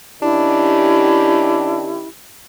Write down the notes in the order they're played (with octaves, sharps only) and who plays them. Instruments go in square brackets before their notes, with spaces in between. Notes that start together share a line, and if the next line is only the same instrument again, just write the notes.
[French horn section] D#3 C#4 G4 [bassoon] D4 [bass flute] E4